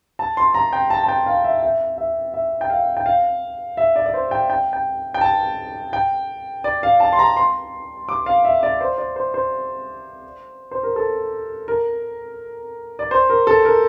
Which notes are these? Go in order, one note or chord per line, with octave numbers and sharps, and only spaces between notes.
A5
C6
A#5
G5
A5
A5
G5
F5
E5
E5
E5
E5
G5
F5
G5
F5
E5
D5
D5
C5
G5
G5
G5
G5
A5
G5
D5
F5
A5
C6
A#5
C6
D6
F5
E5
D5
C5
D5
C5
C5
C5
A#4
A4
A#4
D5
C5
A#4
A4
A#4